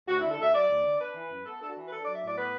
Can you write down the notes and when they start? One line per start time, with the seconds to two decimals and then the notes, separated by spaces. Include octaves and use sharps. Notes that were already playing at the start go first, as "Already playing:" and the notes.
0.08 D2 F#4
0.19 D3 E4
0.31 A4
0.39 D2 E5
0.53 F#3 D5
0.69 D2
0.85 D3
0.99 D4 B4
1.15 E3
1.30 F#2
1.46 B3 A4
1.61 D4 A4
1.68 F#4
1.76 E3
1.86 B4
1.91 D4 A4
2.03 F#3 D5
2.15 E5
2.22 A2 D5
2.37 B3 B4